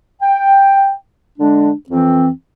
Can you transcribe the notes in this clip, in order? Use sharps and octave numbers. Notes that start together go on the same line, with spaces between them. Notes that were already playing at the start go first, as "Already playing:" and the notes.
G5
D3 G#3 D4
F2 E3 C4